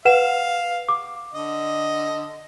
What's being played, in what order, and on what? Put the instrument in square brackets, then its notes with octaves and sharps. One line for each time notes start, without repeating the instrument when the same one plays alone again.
[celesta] B4 F#5 E7 [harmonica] F5
[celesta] D6
[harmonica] D3 D#5